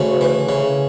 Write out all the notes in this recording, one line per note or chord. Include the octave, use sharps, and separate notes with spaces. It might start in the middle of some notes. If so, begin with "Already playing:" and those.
Already playing: D2 C#3 A3
E3
C#3